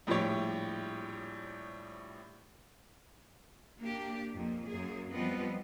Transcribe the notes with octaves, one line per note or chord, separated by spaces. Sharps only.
A#1 A2 F3 G3 G4 C#5
A#3 D4 G4
F2 A#2 A#3
F#2 A#3 G#4
F3 G3 B3 C4 B4 D#5